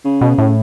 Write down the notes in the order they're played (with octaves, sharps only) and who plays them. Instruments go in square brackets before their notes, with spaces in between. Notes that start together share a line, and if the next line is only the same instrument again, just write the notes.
[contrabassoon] C#3
[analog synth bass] B2
A2